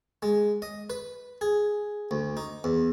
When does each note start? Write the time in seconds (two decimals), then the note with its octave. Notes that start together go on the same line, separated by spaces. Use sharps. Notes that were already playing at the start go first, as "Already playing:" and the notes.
0.22 G#3
0.62 D#5
0.90 B4
1.41 G#4
2.11 D2
2.37 D#4
2.64 E2